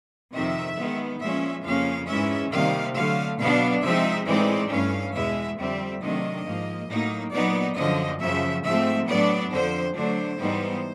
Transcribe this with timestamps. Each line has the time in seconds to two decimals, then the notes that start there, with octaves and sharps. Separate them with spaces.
0.33 F2 C3 D#3 E5
0.76 D#3 G#3 B3
1.20 A#2 F3 G#3 C#4 E5
1.64 F2 C#3 F3 A#3 C#4 F5
2.07 G#2 E3 G#3 C#4 E5
2.52 C3 D#3 G3 A#3 F5
2.95 D3 F#3 A3 F5
3.38 B2 F#3 B3 D4 F5
3.82 C3 F3 G#3 C4 D#4 E5
4.26 A2 E3 G#3 C4 D#4 D5
4.70 G2 E3 A3 C#4 F5
5.14 E2 B2 G#3 E5
5.57 F2 D3 G3 C4 E5
6.01 C3 D#3 F#3 A3 D4 D#5
6.45 G#2 F3 A#3
6.88 A2 F#3 A#3 D#4
7.32 A#2 F#3 B3 D#4 D5
7.76 F#2 D3 F3 D#5
8.19 F#2 C#3 F3 E5
8.64 G#2 F3 A3 C4 E5
9.07 A2 F#3 B3 D4 D5
9.51 F2 D3 F3 C5
9.95 D3 F#3 A3 D4 C5
10.39 G#2 E3 G3 B3 D#4